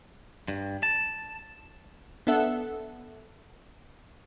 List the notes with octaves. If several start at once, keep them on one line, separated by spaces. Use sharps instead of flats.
G2
A5
B3 D4 A4 E5 F#5